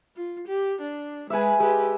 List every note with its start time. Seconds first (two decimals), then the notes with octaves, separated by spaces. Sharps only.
0.16 F4
0.47 G4
0.81 D4
1.30 G#3 B4 E5 G#5
1.60 G#3 G4 B4